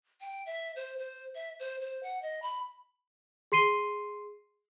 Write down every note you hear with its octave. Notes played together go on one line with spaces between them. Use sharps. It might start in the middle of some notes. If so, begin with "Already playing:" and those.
G5
E5
C5
C5
E5
C5
C5
F#5
D#5
B5
G#4 C6 C7 D#7 G7